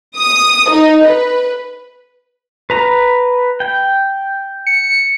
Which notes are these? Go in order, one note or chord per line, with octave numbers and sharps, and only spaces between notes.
D#6
D#4
B4
B4 A#5
G5
C#7